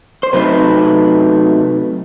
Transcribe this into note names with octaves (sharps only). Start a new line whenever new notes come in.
C5
C3 F#3 A3 D#4 B4